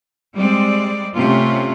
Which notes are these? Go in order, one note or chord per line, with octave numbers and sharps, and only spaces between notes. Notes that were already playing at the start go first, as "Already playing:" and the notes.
G3 G#3 C4 D5
C3 A3 C#4 F4